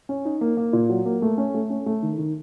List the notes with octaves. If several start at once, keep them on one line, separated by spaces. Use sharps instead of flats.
C#4
D#4
A#3
A#3
A#2
F#3
A#3
A3
C#4
A3
C#4
A3
D#3
D#3